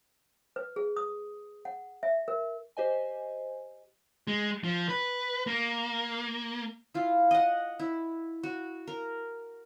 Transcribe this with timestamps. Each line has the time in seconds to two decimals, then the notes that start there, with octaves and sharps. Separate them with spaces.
0.56 B4
0.76 G#4
0.96 D#6
1.65 F#5
2.03 E5
2.28 A#4
2.77 G4 C5 D#5 G#5
4.27 G#3
4.64 F3
4.89 B4
5.47 A#3
6.94 E4 F4
7.31 D#5 F#5
7.79 E4
8.43 F#4
8.87 A#4